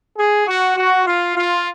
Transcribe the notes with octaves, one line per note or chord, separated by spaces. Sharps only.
G#4
F#4
F#4
F4
F4